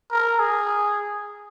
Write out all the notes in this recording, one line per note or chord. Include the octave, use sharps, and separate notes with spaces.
A#4
G#4